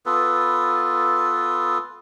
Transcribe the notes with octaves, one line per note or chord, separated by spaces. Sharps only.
B3 F4 A4 B4